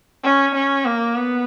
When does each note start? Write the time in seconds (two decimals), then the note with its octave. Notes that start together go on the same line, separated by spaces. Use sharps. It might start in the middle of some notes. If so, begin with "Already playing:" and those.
0.24 C#4
0.55 C#4
0.85 A#3
1.16 B3